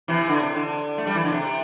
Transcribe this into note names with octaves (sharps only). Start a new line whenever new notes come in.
C3 E3
D3
C3
D3
A3
G3
E3
D3
C3